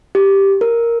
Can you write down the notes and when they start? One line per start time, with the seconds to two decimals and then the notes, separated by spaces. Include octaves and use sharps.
0.15 G4
0.61 A#4